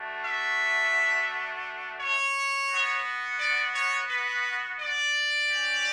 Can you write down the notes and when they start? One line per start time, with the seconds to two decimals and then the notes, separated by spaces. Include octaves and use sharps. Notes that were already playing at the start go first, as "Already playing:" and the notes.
Already playing: A3 D4 F#4
0.25 E5
2.00 C#5
2.69 B3 F#4
3.39 D5
3.74 C#5
4.10 B4
4.79 D5
5.49 C#4 G4